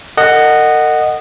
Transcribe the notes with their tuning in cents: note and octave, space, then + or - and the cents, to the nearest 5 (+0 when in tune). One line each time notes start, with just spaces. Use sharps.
A#4 -45 D#5 -15 F#5 +5